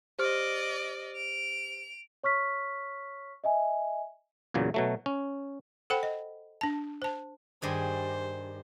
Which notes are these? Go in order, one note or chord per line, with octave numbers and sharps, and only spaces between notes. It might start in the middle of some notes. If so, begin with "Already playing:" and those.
G4 C5 D5 D#5 F6
D7 F7
C#5 C#6 F6 B6
D#5 E5 G#5
E2 A#2 C#3 F#3
B2 F#3 A3
C#4
A4 C5 F#5 G5 B5
D#5
D4 A5
C5 A5
G2 D#3 G#4 C5